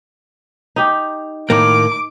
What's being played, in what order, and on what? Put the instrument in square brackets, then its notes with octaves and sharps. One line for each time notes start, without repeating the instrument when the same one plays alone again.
[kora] D#4 G4
[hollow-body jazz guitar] A2 D#3 A#3 [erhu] D6